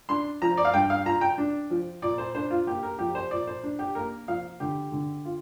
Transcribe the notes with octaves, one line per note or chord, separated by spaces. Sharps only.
D4 C6
F3 A#5
D5
F5
G2 G5
F5
F4 A#5
G5
D4
F3
A#2 D5
C5
D4 C5
F4
A#3 G4
A#4
F3 G4
C5
A#2 D5
C5
D4
G4
A#3 A#4
F3 F5
D3 G4
D3
F4